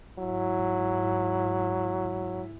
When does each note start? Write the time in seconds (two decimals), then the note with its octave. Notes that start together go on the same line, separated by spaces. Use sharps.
0.18 G#2 F#3 E4